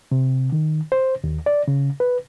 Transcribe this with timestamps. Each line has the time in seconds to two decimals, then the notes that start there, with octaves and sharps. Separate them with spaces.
0.12 C3
0.52 D#3
0.92 C5
1.24 D#2
1.46 D5
1.68 C#3
2.00 B4